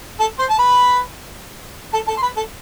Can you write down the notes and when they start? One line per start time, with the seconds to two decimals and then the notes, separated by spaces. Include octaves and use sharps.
0.20 A4 A5
0.39 C5 C6
0.50 A5
0.59 B4 B5
1.93 A4 A5
2.08 A4 A5
2.17 C6
2.23 B4 B5
2.37 A4 A5